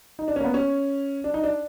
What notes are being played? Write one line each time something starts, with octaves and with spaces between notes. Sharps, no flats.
D#4
D4
C#4
A#3
B3
C#4
D4
D#4
D4